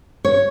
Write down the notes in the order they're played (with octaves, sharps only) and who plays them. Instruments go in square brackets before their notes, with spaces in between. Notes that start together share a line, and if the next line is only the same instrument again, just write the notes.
[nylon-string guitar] C#5